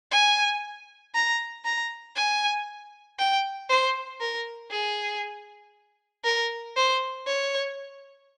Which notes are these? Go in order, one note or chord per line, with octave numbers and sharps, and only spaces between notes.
G#5
A#5
A#5
G#5
G5
C5
A#4
G#4
A#4
C5
C#5